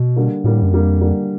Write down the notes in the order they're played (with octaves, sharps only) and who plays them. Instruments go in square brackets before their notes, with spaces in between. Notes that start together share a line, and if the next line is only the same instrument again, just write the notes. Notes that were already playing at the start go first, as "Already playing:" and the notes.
Already playing: [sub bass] B2
[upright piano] D3 G3 A#3
[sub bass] A2 [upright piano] D3 G3 A#3
[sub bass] F#2
[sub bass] F2 [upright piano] D3 G3 A#3
[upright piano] D3 G3 A#3